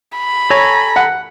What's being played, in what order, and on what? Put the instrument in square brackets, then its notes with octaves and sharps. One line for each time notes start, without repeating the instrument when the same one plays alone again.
[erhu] B5
[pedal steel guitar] A4 G#5 A#5 [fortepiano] C#5
[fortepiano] F#5